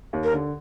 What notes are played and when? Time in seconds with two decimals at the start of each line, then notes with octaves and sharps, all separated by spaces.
0.13 D#2
0.24 A#4
0.33 D3